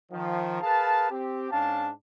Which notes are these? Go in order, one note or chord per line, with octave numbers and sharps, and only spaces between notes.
D#3 F3
G#4 A#4 B4 F5 A5
C4 G4
G#2 C#4 D4 F5 A5